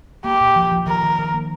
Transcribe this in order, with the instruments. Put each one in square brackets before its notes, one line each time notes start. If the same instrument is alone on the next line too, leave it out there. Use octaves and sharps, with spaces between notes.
[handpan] A#3 [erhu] G4
[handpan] A#2
F3
F3
[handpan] D#3 [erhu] A#4
[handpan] D#3
D#3
A#3